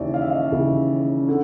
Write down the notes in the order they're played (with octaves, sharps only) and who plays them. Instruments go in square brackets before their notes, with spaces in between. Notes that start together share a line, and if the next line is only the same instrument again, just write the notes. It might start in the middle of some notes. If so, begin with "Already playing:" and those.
Already playing: [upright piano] D#2 C#3 E3 D5 E5
F5
E5
D#5 F5
D#2 C#3 E3
D3